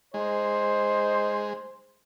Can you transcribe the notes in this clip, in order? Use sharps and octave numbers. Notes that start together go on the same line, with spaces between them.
G#3 D#4 C5